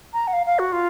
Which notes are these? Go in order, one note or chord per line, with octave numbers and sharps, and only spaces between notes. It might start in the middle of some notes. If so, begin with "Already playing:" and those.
A#5
F#5
F5
F5
F#4
F4